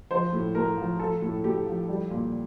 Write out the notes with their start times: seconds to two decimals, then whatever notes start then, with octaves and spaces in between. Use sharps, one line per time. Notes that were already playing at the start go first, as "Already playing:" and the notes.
0.11 F3 C5
0.33 A2
0.55 A2 A#4
0.78 F3
0.99 F3 A4
1.22 A2
1.44 A2 G4
1.66 F3
1.88 G3
2.10 A#2